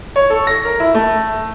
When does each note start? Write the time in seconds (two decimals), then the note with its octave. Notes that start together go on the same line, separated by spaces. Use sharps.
0.16 C#5
0.30 A4
0.47 A#6
0.65 A#4
0.80 E4
0.94 A3